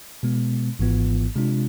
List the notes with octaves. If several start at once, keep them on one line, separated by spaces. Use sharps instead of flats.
B2 G#3 B3
G#1 G#2 E3 B3 F4
C3 G#3 D4 F4